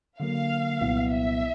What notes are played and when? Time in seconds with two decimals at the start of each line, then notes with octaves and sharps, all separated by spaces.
0.19 D3 F#3 A#3 F5
0.81 C2 A#2 F#3 B3 E4
1.12 E5